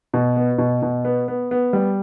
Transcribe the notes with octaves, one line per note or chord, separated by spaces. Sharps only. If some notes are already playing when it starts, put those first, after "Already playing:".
B2
B3
B2
B2
B3
B3
B3
G3